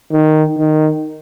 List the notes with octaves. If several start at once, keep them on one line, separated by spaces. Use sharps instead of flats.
D#3
D#3